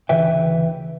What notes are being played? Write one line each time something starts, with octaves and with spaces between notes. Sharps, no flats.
D2 C#3 E3 B4 E5 G5